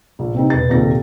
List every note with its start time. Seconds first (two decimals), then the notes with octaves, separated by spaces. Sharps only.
0.19 A#1
0.35 C3 C4 D#4
0.50 E1 B4 A6
0.69 A#1 D#2 C3 A4 A#6